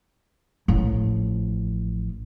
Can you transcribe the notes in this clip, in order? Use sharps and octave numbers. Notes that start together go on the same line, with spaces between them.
A1 F3